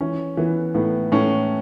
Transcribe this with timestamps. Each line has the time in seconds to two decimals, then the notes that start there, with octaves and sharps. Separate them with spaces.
0.01 E3 C#4
0.37 E3 B3
0.75 A2 B3
1.12 A2 C#4